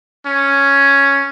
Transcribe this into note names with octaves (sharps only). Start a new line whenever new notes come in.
C#4